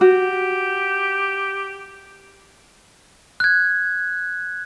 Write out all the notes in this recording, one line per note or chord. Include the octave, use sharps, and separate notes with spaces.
F#4 G4
F#6 G#6